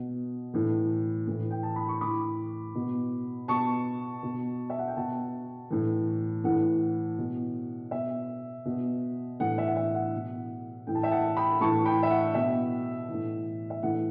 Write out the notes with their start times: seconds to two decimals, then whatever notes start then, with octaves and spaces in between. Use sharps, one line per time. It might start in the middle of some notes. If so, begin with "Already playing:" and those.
Already playing: B2
0.54 A2 E3
1.27 A2 E3
1.50 G5
1.63 A5
1.76 B5
1.88 C#6
2.01 A2 E3 B5 D6
2.75 B2
3.48 B2 A5 C#6
4.23 B2
4.70 E5
4.79 F#5
4.88 G5
4.96 B2 F#5 A5
5.70 A2 E3
6.44 A2 E3 F#5
7.18 B2
7.91 B2 E5
8.65 B2
9.40 A2 E3 F#5
9.58 E5
9.67 F#5
9.76 E5
9.95 F#5
10.14 B2
10.87 A2 E3 G5
10.95 A5
11.03 E5 G5
11.11 F#5 A5
11.37 G5 B5
11.60 A2 E3 A5 C#6
11.85 G5 B5
12.03 E5
12.10 F#5
12.34 B2 E5
13.08 E3
13.13 A2
13.70 E5
13.83 A2 E3 F#5